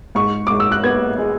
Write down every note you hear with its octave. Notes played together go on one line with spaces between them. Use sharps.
G#2 C#6
G#2 D6
E6
F#6
B3 G#6
G#3